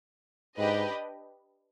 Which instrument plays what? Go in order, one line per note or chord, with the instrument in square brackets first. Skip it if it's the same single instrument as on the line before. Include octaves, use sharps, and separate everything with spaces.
[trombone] G#2 [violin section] D4 G4 B4 D#5